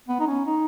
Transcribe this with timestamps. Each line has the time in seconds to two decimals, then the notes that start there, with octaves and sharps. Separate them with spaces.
0.09 B3
0.20 D#4
0.27 C#4
0.46 D#4